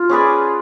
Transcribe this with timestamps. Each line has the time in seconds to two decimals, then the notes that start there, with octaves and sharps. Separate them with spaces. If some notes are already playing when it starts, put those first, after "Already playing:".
Already playing: F4
0.09 C#4 G#4 B4 D5